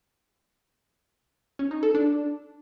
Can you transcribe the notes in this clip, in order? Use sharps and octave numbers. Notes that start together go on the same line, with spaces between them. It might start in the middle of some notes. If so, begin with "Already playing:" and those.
C#4
D#4
A4
D4